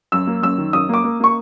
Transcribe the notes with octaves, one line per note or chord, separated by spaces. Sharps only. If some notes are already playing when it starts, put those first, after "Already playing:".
F#2 E6
A#3
F#2 E6
D#3
F#2 D#6
A#3 D6
A#3
A#3 C#6